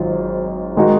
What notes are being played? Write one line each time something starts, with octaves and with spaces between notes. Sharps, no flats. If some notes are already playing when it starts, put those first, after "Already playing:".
Already playing: G#1 G#2 F#3 F4
D#3 G#3 D#4 F#4